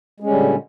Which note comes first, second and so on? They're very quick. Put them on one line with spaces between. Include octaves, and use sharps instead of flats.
G#3 C#4 G3 D3 A#2